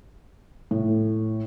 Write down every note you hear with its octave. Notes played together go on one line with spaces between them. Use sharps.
A2